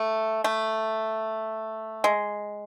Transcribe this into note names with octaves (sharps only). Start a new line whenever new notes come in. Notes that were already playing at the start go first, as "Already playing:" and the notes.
Already playing: A3
A3
G#3